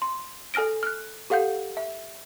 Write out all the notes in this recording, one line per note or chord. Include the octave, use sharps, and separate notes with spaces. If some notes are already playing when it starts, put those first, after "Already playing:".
C6
A4 G#5 F6 A#6 D7
F6 F#6
G4 A4 F5 F#5 G6
E5